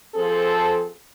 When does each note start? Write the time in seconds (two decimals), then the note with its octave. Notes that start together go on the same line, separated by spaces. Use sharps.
0.15 F3 C4 G#4 A4